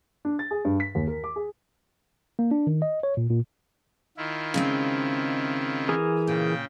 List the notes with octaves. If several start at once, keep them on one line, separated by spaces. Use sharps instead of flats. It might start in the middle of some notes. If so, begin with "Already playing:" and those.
D4
A6
G#4
G2
B6
D#2
A#4
D6
G#4
A#3
D4
D#3
D#5
C#5
A#2
A#2
D#3 E4 F4
C#3 G#3 C4
E3 G#4 A#4
A#2 C#3 G5